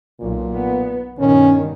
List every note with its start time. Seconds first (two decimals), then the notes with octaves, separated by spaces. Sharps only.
0.20 B1 A#2
0.54 B3
1.19 G2 B2 D#3 C#4